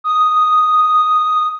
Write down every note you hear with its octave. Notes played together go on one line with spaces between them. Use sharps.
D#6